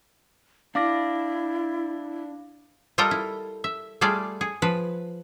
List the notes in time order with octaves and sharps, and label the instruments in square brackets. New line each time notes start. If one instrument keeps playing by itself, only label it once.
[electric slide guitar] D4 [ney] E4 [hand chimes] F5 D6 A#6
[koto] G3 F4 A4 A#4 D#5 G5
E4
E5
G3 A3 F4 G#4 D5
G#4
F3 B4